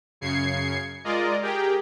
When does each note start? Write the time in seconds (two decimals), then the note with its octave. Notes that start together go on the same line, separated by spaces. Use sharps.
0.21 F#2 C#3 G#6 C7 C#7
1.04 G#3 F4 A#4 D5 D#5
1.42 G4 G#4 A#4 G5